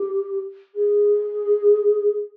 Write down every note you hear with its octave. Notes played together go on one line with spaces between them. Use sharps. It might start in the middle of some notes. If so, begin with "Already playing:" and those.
Already playing: G4
G#4